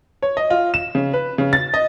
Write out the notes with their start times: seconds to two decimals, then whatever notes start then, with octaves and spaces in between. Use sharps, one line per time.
0.22 C#5
0.37 D#5
0.50 F4
0.74 E7
0.95 C#3
1.13 B4
1.38 C#3
1.53 A6
1.74 D#5